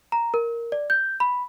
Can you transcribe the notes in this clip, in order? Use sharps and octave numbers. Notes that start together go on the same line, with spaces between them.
A#5
A#4
D5
G6
B5